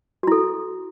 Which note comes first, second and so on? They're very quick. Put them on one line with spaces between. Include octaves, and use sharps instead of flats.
F#4 E4 A4